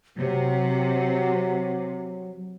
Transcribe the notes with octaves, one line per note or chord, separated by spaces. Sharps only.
C3 F#3